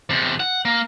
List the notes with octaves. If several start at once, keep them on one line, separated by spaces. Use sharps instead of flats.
E2 C3
F#5
A#3